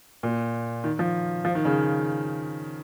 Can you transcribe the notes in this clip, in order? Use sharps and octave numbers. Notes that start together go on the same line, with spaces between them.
A#2
D#3
F3
F3
D#3
C#3